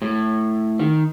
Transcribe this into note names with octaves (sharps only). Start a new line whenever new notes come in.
A2
D#3